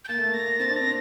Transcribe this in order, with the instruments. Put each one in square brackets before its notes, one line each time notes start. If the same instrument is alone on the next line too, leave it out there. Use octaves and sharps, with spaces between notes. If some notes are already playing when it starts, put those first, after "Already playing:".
[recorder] G6
[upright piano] A#3 [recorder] A6
[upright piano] A3
A#3
[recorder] A#6
[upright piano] C4 [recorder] A6
[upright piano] D4
[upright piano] C4 [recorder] A#6